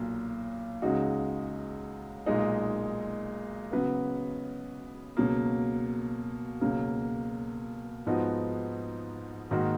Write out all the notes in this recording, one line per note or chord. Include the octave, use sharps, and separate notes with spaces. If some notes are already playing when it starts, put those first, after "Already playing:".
Already playing: B1 A#2 F#3 A#3
C#2 C#3 G#3 D#4 F#4
B1 A#2 G#3 D#4
C#3 F#3 B3 F#4 B4
C#2 B2 F#3 A#3
C#2 B2 F#3 A#3
G#2 F3 B3 D#4 F#4
G#2 D#3 A#3 D#4 F#4